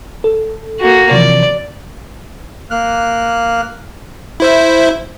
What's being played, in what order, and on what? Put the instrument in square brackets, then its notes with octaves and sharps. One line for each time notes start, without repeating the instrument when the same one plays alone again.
[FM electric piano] A4
[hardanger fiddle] A#3 F#4
[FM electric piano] C3 E3 F3 [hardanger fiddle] D5
[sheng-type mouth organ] A#3 F6 F#6
[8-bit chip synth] E4 C5 E5